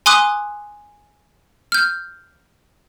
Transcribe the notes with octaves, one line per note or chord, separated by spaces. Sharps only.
G#5 C6 D6 D#6 F#6
F6 G6